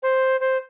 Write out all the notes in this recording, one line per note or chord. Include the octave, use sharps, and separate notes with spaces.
C5
C5